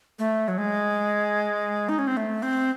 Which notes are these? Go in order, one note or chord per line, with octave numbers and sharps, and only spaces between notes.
A3
F#3
G#3
D#4
C#4
C4
A3
C4